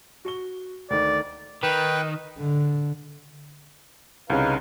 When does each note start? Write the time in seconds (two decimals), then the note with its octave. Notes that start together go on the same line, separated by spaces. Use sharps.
0.25 F#4 C#6 G7
0.90 D2 D#3 D5
1.63 D#3 B4 G5 F#6
2.38 D3
4.30 C2 C#3 D#4 B4 F5